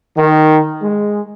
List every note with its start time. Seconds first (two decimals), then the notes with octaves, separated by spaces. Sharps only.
0.16 D#3
0.81 G#3